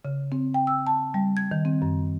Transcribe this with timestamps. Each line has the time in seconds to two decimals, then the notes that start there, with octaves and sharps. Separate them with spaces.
0.05 C#3
0.32 C4
0.54 G5
0.67 E6
0.87 A5
1.14 G3
1.37 G#6
1.51 D#3
1.65 C4
1.82 F#2